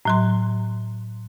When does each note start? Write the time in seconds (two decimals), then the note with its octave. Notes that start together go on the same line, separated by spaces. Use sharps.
0.05 A2 F#3 C6